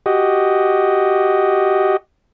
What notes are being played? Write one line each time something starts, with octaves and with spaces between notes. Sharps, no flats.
F#4 G4 D#5